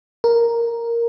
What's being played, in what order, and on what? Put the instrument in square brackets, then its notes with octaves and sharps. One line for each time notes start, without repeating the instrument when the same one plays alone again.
[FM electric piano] A#4